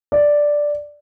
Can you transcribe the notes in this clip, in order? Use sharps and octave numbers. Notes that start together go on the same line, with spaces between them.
D5